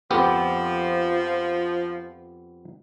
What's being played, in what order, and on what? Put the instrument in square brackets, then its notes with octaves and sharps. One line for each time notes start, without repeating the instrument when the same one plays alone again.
[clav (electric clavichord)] F2 B3 G4 [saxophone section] F3